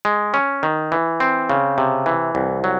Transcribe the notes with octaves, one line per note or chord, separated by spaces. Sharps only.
G#3
C#4
D#3
E3
C4
C#3
C3
E3
C2
F#3